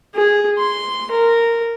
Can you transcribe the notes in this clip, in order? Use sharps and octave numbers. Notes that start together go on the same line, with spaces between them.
G#4
C6
A#4